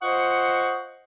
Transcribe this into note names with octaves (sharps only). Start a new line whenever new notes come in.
F4 C5 D#5 F#5 C#6 D#6